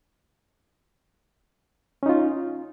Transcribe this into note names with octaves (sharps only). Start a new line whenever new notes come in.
C#4 D#4 F4